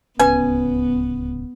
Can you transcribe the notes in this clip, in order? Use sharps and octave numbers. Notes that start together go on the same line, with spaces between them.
D1 C#2 B3 C#4 B4 G#5